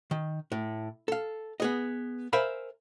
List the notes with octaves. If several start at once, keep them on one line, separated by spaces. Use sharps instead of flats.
D#3
A2
A4 F5
B3 G#4 D#5
A#4 C5 E5 F5 G#5 B5